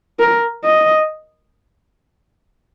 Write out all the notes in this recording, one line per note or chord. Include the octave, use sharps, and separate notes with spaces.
A#4
D#5